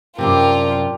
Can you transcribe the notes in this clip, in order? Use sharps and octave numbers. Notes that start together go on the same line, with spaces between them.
F#2 A2 C3 G3 D4 F4 G4 A#4